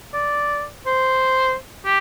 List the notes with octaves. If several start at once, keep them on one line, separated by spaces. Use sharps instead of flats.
D5
C5
G4